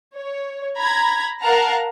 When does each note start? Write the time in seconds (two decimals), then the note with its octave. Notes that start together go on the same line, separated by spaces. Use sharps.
0.18 C#5
0.79 A#5 B5 G#6
1.42 A#4 F5 F#5 A5 A#5 F6